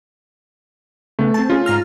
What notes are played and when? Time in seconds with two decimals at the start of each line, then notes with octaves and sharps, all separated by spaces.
1.19 C#3 A3 B3
1.34 C4 A5
1.50 C#4 F4 G#4
1.66 G#2 A#5 F6